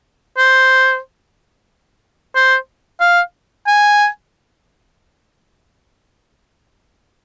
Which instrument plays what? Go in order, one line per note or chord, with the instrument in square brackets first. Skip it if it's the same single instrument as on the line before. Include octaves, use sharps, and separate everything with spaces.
[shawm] C5
C5
F5
G#5